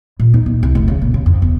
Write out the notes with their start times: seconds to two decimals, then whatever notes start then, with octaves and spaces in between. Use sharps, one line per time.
0.20 A#2
0.34 D#4
0.46 A#1
0.63 C2
0.75 F1
0.88 C#3
1.02 A#2
1.14 C#3
1.26 F2
1.42 E1